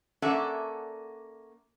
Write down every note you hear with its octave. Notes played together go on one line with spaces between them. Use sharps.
A#3 C#4 A4 D5 E5 F#5